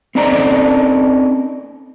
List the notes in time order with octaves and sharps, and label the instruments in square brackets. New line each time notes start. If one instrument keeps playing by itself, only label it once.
[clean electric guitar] C4 C#4 D#4 A4 D5 A#5